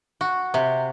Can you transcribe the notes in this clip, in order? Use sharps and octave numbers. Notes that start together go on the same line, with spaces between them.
F#4
C3